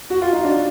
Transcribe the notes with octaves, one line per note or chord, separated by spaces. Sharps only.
F#4
F4
D#4
D4